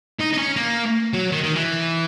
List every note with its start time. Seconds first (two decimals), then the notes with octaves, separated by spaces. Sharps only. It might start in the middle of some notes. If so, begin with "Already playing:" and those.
0.20 D#4
0.34 D#4
0.38 C#4
0.57 A#3
1.13 F#3
1.32 D#3
1.44 D#3
1.56 E3